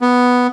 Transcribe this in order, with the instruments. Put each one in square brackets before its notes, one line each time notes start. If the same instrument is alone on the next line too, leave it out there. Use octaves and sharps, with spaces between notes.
[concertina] B3